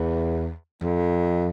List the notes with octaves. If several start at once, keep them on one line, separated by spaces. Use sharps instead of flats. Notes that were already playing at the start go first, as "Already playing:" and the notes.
Already playing: E2
F2